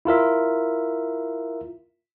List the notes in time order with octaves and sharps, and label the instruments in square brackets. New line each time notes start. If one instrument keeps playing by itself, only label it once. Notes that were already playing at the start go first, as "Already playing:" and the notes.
[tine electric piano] E4 F4 A#4 E5